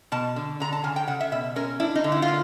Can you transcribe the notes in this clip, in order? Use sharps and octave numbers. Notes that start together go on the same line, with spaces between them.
B2 A5
D3
D3 A#5
A5
C#3 G#5
G5
C#3 F#5
E5
B2 E5
C#4 A#4
D4 E4
D#4
D3
E4
F4
A#3